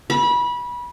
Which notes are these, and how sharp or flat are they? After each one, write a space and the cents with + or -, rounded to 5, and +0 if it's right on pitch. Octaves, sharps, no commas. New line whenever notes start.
B5 -25